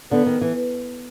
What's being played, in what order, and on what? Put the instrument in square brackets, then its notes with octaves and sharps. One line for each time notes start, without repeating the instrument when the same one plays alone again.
[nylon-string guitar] D3 [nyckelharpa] B3
[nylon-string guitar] D#3
E3